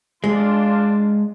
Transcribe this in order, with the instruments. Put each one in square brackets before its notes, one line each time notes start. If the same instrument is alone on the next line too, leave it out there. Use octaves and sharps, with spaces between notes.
[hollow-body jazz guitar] G#3 [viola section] D4 F4